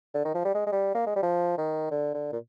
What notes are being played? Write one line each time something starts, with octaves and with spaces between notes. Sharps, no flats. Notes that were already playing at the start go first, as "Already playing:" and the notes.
D3
D#3
F3
G3
G#3
G#3
G3
A#3
G#3
G3
F3
D#3
D3
D3
A#2